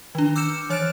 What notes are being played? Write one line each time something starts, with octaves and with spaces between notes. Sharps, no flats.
D#3 D4
D6 E6 F6 G6 C#7 E7
E3 C#5 F6 F#6 A6 D7